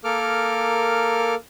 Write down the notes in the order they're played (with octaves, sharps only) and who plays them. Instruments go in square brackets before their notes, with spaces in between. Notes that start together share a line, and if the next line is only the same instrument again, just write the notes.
[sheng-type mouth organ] A#3 A4 A#4 D6 F6